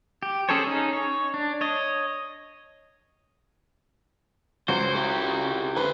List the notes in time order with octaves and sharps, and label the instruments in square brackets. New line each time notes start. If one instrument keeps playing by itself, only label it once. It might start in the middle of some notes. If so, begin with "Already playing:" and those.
[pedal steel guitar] G4
C#4 G#4 A4 C5 C#5
C#4 D#4 G#4
C#5
D4
C#5 D#5
[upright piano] C#2 [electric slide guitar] C#3 F#4 [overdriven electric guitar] C5
[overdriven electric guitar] E4 G4
[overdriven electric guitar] D3 C5 [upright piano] B4